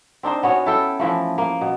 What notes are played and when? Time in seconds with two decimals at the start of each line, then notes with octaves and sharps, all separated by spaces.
0.23 C4 D4 D#4 C5
0.43 B3 C#4 F#4 C#5
0.66 E4 A4 G5
1.00 E3 F3 A3
1.38 A#3
1.61 B2